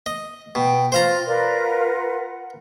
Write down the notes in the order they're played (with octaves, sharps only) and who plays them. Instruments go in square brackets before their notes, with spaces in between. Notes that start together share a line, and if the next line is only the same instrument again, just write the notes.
[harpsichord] D#5
[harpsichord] B2 [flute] G5
[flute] F4 [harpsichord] C5 F5 A#5
[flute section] F4 A#4 B4 [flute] D5
[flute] F#5